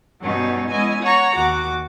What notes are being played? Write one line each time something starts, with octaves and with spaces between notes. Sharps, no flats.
G2 B2 F#3 G3 C#4 D#4
G#3 B3 C#4 E4 D#5 G#5
C#5 F#5 A#5 C#6
D#2 F#4 D6